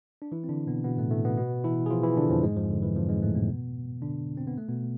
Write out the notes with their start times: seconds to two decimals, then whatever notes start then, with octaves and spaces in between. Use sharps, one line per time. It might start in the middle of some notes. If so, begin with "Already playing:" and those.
0.22 D4
0.32 E3 E4
0.44 C4
0.49 D3 D4
0.67 B2 B3
0.84 B2 B3
0.98 A2 A3
1.11 A2 A3
1.25 B2 B3
1.37 B2 B3
1.64 E3 E4
1.86 G#4
1.90 F3 F4
2.03 E3 E4
2.17 D3 D4
2.30 F2 F3
2.43 G#2 G#3
2.56 F2 F3
2.70 D3
2.83 E3
2.96 F2 F3
3.09 G#2 G#3
3.22 A2 A3
3.35 B2 B3
4.02 D3 D4
4.37 C4
4.47 B3
4.58 A3
4.68 B2 B3